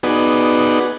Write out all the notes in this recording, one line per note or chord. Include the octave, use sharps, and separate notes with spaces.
B3 D#4 F#4 G#4 B4 D5